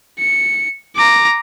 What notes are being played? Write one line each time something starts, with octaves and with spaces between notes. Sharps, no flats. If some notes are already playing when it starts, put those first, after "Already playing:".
C#7
A#5 D6